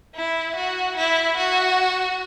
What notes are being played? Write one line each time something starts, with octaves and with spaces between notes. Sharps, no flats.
E4
F#4
E4
F#4